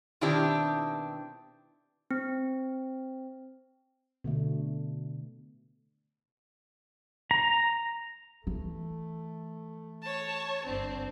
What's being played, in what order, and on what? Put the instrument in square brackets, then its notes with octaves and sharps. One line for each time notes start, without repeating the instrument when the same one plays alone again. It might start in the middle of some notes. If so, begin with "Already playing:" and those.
[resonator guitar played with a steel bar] B2 D#3 C4 D4 E4 G4
[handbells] C4
[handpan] B2 D3 A3
[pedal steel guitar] A#5
[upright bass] E3 [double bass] A3
[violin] C#5 A5
[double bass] G1 D4 [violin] C4